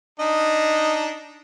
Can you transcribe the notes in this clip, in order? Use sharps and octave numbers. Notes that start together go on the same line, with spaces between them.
D4 D#4 D#5